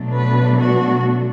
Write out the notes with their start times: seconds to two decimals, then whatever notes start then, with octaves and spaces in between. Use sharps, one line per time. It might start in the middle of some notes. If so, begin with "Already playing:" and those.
Already playing: B2 F#3 A3 D4
0.13 B4
0.58 F#4